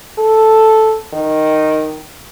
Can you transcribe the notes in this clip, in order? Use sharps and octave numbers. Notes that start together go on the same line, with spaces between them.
A4
D#3